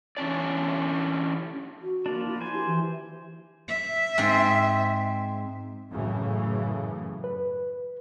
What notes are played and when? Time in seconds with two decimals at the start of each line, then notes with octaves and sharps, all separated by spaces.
0.17 E3 C#4 D4 D5
1.82 F#4
2.06 F3 A#3 D4
2.24 E4
2.41 C5 G#5
2.54 G4
2.67 E3
3.68 E5
4.18 G#2 C4
5.92 F#2 A2 C#3 E3
7.24 B4